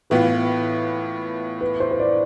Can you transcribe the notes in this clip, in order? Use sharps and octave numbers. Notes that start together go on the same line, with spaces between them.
A2 E3 B3 F4 B4
B4
C5
C5
D5